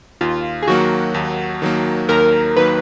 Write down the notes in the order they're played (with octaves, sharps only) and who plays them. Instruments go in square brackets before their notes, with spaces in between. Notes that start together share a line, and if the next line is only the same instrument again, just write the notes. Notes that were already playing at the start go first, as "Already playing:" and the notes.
[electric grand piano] D#2 [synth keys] F4
[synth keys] G#4
[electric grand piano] D#3 F#3 A#3 [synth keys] F#4
[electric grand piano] D#2
D#3 F#3 A#3
[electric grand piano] D#2 [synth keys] A#4
[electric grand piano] D#3 F#3 A#3 [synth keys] B4